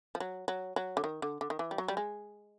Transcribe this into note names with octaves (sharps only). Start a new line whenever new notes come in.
F3
F#3
F#3
F#3
D3
D#3
D3
D3
D#3
E3
G3
F#3
G3
G#3